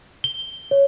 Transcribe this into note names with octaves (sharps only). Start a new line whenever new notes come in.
G7
C#5